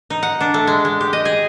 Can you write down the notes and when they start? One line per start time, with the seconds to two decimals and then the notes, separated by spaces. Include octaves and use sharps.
0.10 D#4
0.23 F#5
0.41 D4
0.54 A3
0.67 G#3
0.85 G#3
1.01 G4
1.13 D#5
1.25 G#4